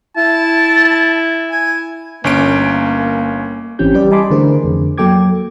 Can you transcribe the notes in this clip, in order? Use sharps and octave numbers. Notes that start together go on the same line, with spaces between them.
E4 A5
G#5
G1 A#3 C#4 D7
G#1 E3 C4 C#4 G4 G6
G3 G4 B4 D5
D#5 G#5 A5 B5 C6 D6
D3 E3 A3 G#4 A#4 C5
F2 D3
F#3 A#3 A4 G5 D6 G#6